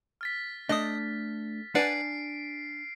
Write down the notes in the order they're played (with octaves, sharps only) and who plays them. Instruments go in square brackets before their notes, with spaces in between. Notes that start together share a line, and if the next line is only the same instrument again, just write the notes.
[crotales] F6 A6 B6
[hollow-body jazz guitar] A3 D4 [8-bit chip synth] D#5 D#6
[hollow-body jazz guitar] D4 G#5 [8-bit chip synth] B4 D5 F#5 [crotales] C7 D7